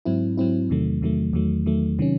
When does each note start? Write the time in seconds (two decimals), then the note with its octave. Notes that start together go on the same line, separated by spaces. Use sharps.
0.05 G#2 F#3 C4 E4
0.37 G#2 F#3 C4 E4
0.70 E2 C3 D#3 F#3 A3
1.02 E2 C3 D#3 F#3 A3
1.33 E2 D#3 F#3 A3
1.66 E2 D#3 F#3 A3
1.99 C3 D#3 F#3 C#4